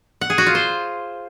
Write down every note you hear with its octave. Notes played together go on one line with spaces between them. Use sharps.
F#5
G#4
F#4
F4
C5